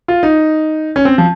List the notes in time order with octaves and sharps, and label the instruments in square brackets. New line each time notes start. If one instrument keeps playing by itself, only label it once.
[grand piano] F4
D#4
C#4
C4
F3